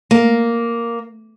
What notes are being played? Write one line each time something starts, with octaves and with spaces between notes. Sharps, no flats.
A#3